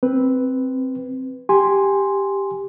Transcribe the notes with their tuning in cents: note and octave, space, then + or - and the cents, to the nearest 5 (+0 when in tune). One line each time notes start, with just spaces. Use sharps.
C4 +0 B4 +0
G4 +5 G#5 -5 C6 +0